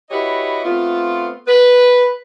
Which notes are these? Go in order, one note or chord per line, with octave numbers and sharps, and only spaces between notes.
E4 F#4 G4 B4 C#5 D#5
A3 B3 C4 F4
B4